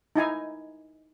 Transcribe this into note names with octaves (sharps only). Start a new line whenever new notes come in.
D#4 E4 G#5 A#5